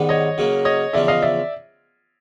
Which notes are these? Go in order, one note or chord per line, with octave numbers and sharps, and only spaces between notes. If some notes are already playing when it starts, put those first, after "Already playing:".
Already playing: G#2 D#3 G3 B3
C#5 D#5
C#3 F#3 A#3
C#5 D#5
E2 C#3 F3 D5 E5
D#5 F5
D5 E5